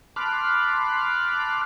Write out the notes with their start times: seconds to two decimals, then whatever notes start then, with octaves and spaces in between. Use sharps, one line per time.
0.16 A5 B5 C6 D6 F6 F#6